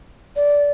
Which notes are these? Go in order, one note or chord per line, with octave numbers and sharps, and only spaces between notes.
D5